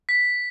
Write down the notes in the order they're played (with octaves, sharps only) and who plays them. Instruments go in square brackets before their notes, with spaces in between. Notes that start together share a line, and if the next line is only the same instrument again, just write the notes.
[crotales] B6